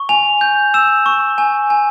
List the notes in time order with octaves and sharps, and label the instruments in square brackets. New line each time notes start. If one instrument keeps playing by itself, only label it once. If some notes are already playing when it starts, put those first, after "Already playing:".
Already playing: [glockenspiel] C#6
G#5 F7
G6
E6 E7
C#6
G#5
G#5